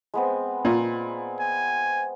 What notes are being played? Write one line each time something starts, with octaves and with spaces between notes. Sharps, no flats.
G#3 B3 C4
A#2
G#5